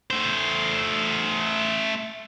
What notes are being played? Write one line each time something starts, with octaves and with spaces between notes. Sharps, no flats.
A3 C5